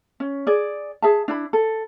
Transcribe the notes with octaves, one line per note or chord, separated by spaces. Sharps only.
C#4
G#4 D5
G#4 E5 A5
D4 E4 B5
A4